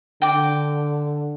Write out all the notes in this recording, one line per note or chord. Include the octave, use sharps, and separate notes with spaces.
D3 G5 D6